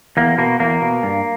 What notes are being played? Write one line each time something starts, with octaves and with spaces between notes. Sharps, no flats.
E2 A#3
B2 A#3
E2 A#3
B2
G2